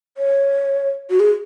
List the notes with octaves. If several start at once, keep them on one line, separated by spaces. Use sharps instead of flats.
C#5
F#4
G#4